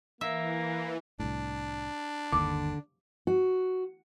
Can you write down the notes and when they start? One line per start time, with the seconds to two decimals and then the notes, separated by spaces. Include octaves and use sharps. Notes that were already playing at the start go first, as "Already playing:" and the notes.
0.21 E3 A#3 E5
1.20 C2 A2 D4
2.32 G1 D#2 D3 D#3 D6
3.27 F#4